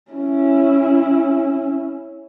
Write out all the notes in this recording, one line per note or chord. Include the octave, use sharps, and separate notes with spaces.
C#4 E4